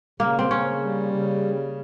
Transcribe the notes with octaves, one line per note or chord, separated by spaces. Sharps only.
C#3 A#3
C4
C#3 C#4
G3
C#3